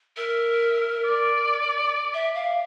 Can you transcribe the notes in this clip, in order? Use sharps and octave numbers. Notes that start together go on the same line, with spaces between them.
A#4 E5
D5
E5
F5